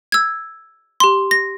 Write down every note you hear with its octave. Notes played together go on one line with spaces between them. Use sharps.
E6 G#6
G4 C6
A#6